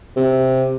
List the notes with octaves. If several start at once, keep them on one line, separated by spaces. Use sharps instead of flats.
C3